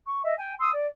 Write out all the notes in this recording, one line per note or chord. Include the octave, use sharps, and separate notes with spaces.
C#6
D#5 E5
G5 G#5
C6 D#6 E6
D5